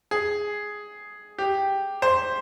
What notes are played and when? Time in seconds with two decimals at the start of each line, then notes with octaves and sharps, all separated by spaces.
0.11 G#4
1.38 G4
2.02 C5